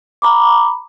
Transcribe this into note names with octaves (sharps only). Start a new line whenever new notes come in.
A#5 B5 D6